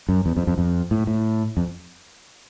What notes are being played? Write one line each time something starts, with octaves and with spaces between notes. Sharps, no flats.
F#2
E2
F2
F2
F2
A2
A2
F2